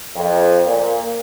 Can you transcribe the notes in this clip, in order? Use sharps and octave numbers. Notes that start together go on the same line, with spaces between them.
F2
A#2